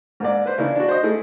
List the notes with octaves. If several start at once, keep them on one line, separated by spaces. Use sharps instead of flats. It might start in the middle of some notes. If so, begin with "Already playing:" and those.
G#2 A#3 D5
B4 C5
C#3 A#3 D4 E4
D4 F#4
C5 D#5
A3 E4 G#4